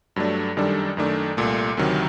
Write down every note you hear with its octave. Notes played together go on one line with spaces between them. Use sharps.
G2 F#3 A3 D4
F#2 D#3 G3 D4 A4
F#2 D#3 A3 D4
C2 A#2 A3
D2 C3 D#3 F#3